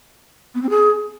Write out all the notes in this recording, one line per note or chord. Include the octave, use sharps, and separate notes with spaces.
B3
C4
G#4